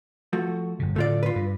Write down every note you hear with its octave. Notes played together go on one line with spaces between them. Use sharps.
F3 A3 F#4
G1 C#3
A2 D3 A3 F4 D5
F4 B4
G2